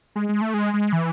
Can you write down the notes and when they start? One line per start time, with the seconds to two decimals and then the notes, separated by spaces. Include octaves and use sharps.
0.16 G#3
0.29 G#3
0.41 A3
0.54 G#3
0.74 G#3
0.93 E3